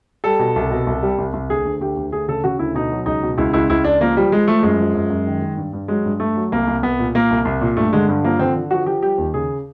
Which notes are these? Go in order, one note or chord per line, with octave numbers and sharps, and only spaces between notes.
G3 A4
B2
C2
B2
C2
G3
C2
C2
D2 G#4
D2
D2 G4
D2
D2 G#4
C#3 A4
C#3 F#4
D2 E4
B2 D#4
F#3
C#2 D#4
B2
C#2 E4
C#2 E4
C#2 E4
C#2 D4
F3 A#3
F3 G3
F3 G#3
F3 A3
F#2 G#3
F3
F#2
F#2
D#3
D#3
G2
G2
F#3 G#3
G2
G2 A3
F#3
C2 A#3
C2
C2 B3
A#2
A#2 A#3
C2
C2
A#2
G2 A3
D3 G#3
G2
F3 A#3
D3 C4
D3
F3 F#4
F3 G4
G3 G4
D#2
C#3 G#4